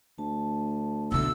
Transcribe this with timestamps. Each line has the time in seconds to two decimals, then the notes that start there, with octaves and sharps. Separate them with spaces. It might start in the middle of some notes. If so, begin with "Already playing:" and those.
0.18 D2 A5
1.12 B1 D3 F#4 E5 F#5 E6